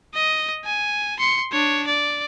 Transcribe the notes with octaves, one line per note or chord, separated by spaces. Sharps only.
D#5
G#5
C6 C#7
D4 C#5
D5